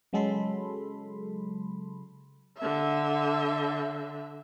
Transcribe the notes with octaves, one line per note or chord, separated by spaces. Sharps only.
C#3 F#3 G#3 A4 B5 C6
D3 E5